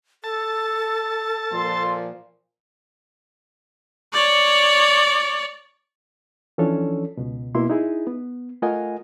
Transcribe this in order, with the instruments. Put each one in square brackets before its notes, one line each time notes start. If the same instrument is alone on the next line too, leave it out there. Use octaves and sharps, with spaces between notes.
[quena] A4 [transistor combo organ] A5
[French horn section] A#2 F3 [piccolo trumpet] C6
[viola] C#5 D5
[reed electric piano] E3 F3 C#4 D4 A4 C#5
C#2 B2
B2 A#3 E4 C6
D#4 E4 G#4
B3
A3 F4 A#4 D#5 F#5 G#5